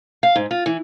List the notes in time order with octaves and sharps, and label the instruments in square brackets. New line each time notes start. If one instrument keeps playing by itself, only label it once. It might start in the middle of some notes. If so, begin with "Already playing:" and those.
[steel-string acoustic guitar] F5
G#2
F4
E3